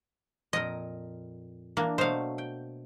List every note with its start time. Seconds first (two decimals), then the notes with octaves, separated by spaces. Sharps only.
0.53 F2 A#2 A#4 D#5
1.77 E3 A#3 D4
1.98 B2 F#3 A3 C5 F5
2.38 G5